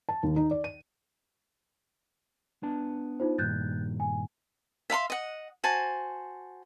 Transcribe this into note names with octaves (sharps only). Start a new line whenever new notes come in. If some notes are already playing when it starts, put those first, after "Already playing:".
A5
D#2
D#4
D5
D#7
B3 D4 A5
D#4 F4 C5
G2 A#2 D#3 F#6 G6 A6
G#5
E5 F5 B5 C6
D#5 F#5
F#4 C5 G#5 A5